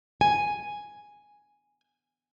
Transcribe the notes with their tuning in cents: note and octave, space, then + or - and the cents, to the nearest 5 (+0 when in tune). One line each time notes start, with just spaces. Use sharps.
G#5 +0